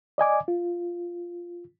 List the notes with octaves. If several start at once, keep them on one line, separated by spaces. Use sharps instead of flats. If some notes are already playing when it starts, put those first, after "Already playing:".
D5 D#5 G#5 D6
F4